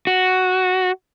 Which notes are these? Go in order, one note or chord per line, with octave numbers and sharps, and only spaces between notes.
F#4